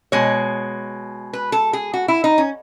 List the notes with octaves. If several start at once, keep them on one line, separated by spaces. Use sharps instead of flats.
B2 G#3 C#5
B4
A4
G#4
F#4
E4
D#4
C#4